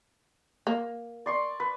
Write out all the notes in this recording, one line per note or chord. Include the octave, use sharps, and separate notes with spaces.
A#3
D5 C6 C#6
B4